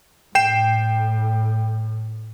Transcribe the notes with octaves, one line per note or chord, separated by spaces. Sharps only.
A2 G5 C7 E7